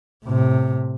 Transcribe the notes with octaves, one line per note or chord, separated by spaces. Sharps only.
A2 C3